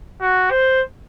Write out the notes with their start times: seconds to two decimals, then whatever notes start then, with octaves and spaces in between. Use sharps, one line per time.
0.21 F#4
0.51 C5